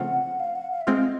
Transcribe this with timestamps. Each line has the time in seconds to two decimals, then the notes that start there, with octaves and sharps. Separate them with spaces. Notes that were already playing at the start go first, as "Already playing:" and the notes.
Already playing: C#3 F3 A3 C4 F4 F#5
0.40 F5
0.55 F#5
0.71 F5
0.81 E5
0.87 G#3 C4 F4 D#5